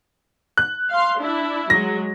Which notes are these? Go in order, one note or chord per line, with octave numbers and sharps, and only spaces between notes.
F#6
F5 C6
D4 E4
F#3 G#3 A#6